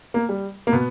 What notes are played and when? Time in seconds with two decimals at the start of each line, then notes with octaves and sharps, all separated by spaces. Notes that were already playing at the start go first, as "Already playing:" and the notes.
0.14 A#3
0.29 G3
0.67 A#3
0.73 B2 B3